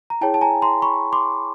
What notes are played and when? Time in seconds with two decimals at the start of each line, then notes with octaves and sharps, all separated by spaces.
0.10 A#5
0.21 E4 G#4 C#5 G5 A5
0.34 A5
0.41 G#5 A#5
0.62 A#5 C6
0.82 B5 C#6
1.13 C6 D6